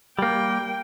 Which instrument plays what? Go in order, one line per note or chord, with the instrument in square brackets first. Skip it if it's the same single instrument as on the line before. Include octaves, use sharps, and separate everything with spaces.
[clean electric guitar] G3 A#3 [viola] G5